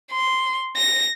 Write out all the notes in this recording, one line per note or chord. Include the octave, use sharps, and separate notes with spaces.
C6
A#6